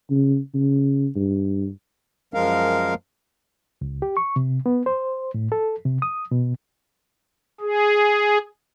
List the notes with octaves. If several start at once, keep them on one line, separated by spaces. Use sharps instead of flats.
C#3
C#3
G2
F#2 F3 G#3 A#4 F5
C#2
G4
C#6
C3
B3
C5
A2
A4
C3
D#6
B2
G#4